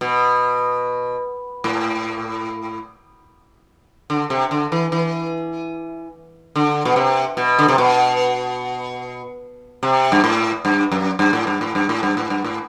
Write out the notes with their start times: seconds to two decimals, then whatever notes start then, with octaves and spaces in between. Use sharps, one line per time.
0.01 B2
1.64 A2
4.10 D3
4.30 C3
4.51 D3
4.72 E3
4.92 E3
6.56 D3
6.85 B2
6.96 C3
7.37 B2
7.59 D3
7.68 C3
7.78 B2
9.83 C3
10.12 G2
10.24 A2
10.65 G2
10.92 F#2
11.19 G2
11.33 A2
11.47 G2
11.61 A2
11.75 G2
11.89 A2
12.03 G2
12.17 A2
12.30 G2
12.44 A2